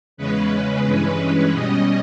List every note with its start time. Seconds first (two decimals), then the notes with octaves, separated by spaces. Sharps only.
0.17 E2 C#3 G#3 C#4 B4
0.85 G2 E3 G#3 C#4
1.53 B2 G3 C#4 D#5